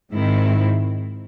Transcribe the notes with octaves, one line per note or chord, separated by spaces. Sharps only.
G#2 D#3 G#3 C4 E4